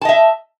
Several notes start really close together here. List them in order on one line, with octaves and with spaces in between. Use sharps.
A5 D#5 E5